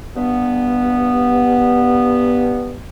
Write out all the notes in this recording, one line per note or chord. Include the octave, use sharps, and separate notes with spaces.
G2 B3